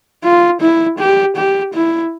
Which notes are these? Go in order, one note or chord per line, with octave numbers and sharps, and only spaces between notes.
F4
E4
G4
G4
E4